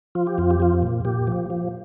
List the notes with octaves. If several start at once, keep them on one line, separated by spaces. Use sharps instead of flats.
F3 F4
G4
F2 F4
G4
F3 F4
A#2
A#2 G4
F3
F3